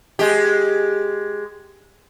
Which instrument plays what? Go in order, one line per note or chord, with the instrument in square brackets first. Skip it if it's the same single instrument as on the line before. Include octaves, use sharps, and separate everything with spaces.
[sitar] G#3 G4